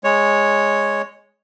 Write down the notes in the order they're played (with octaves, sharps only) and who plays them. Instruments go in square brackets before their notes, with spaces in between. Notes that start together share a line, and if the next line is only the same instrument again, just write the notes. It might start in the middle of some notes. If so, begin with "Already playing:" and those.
[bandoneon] G#3 C#5